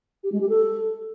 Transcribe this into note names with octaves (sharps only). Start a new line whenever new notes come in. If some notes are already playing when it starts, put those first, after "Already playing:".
G4
G#3
G4
A4